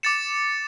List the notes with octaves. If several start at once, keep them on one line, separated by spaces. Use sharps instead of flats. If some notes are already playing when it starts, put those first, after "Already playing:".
D6 A6 C#7 E7